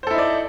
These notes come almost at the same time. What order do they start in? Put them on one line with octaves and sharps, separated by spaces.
C5 A4 E4 D#4 D5